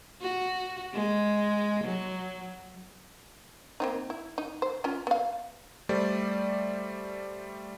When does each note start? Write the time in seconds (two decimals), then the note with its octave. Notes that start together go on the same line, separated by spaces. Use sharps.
0.21 F#4
0.94 G#3
1.84 F#3
3.80 A#3 C4 D#4
4.10 E4
4.38 D#4
4.62 C5
4.84 C#4 F4
5.07 B3 F5
5.89 G3 A3 C5 D5